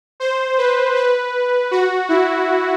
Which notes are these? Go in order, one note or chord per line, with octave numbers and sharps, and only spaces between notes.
C5
B4
B4
F#4
E4